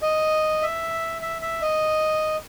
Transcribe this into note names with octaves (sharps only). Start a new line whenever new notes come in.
D#5
E5
E5
E5
D#5